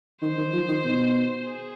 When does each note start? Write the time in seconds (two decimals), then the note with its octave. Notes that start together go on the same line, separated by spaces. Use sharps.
0.22 D#3 C5
0.38 D#3
0.53 F3
0.68 D#3
0.84 B2
1.45 G#4